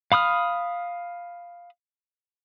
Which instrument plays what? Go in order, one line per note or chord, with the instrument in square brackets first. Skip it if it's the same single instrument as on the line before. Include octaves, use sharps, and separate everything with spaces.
[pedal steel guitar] F5 B5 D#6 F6